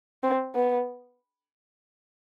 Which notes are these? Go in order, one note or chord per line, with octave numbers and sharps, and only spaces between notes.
C4
B3